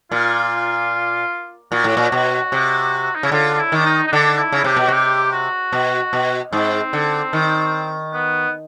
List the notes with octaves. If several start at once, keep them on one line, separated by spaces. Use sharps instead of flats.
A#2 F4
A#2 F#4
A2
A#2
B2
C3
D#4
C#3 E4
D3 F4
F4
E4
D#3 D4
D#4
D#4
D3 D4
E4
C#3
C3 G4
B2
C3 F#4 G4
F#4
B2
B2
G#2 C4
D3
D#3
B3